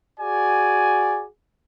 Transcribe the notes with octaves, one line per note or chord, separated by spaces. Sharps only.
F#4 G#4 D5 G#5